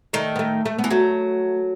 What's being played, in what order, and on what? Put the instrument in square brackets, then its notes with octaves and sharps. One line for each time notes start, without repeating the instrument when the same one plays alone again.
[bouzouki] D#3 [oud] A3
[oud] B3
A3
A3
B3
[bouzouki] E3
[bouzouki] F#3 [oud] A3